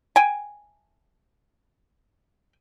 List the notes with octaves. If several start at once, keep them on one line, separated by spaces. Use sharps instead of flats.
G5 G#5